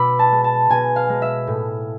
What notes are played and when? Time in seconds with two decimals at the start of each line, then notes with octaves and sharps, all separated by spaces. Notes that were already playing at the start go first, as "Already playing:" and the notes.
Already playing: B2 B5 D6 E6
0.19 A5
0.32 G#3
0.44 A5
0.70 B2 G#5
0.96 F5
1.09 G#3
1.22 E5
1.47 A2